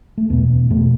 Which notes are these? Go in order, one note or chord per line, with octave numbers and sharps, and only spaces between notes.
A3
E2 B2 B3
E2 B2 A3